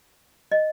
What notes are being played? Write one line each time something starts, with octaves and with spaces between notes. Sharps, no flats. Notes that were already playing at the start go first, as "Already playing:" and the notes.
D#5